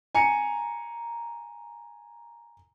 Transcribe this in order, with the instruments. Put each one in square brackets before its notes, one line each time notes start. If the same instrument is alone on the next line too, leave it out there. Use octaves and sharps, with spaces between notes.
[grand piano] G#5 A#5 C#7